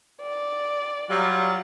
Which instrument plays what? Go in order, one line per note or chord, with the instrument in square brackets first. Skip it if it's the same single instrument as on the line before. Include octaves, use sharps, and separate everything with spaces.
[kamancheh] D5
[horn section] F#3 G3 F4